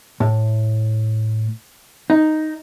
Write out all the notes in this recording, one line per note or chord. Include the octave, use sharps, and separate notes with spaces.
A2
D#4